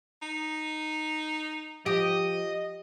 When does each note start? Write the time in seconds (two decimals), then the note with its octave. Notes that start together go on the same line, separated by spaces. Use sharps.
0.22 D#4
1.86 F3 G4 D#5